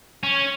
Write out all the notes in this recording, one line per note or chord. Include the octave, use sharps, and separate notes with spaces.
C#4